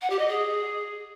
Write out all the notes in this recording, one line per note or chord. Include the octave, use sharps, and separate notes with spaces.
F#5
G4
D#5
G#4